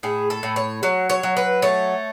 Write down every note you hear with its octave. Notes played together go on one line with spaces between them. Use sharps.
A2 G#4
A4
A2
C#5
F#3 C#5
C#5
F#3
B4
A3 C#5